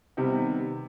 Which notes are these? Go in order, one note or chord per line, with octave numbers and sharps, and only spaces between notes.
C3 D#3 G3 B3